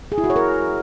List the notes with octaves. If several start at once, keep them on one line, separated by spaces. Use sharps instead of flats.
G#4
E4
F#4
C#5
A#4